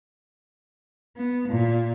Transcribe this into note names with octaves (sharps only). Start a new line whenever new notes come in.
B3
A#2